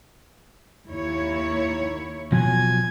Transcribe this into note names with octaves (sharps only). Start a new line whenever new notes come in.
D#2 E4 C#5
B2 F3 F#3 G#5